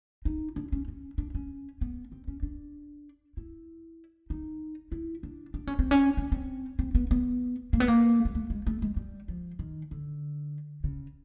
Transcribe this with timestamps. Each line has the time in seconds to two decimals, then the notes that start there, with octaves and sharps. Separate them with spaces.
0.25 D#4
0.56 D4
0.72 C#4
0.88 C#4
1.18 D4
1.35 C#4
1.81 B3
2.12 C4
2.27 C#4
2.43 D4
3.37 E4
4.30 D#4
4.92 E4
5.23 D4
5.54 D4
5.67 C#4
5.79 C4
5.91 C#4
6.17 C#4
6.32 C4
6.79 C4
6.95 B3
7.11 B3
7.73 A#3
7.80 B3
7.88 A#3
8.25 G#3
8.35 A3
8.50 G#3
8.67 A3
8.82 G#3
8.96 G3
9.28 F3
9.59 D#3
9.91 D3
10.84 C#3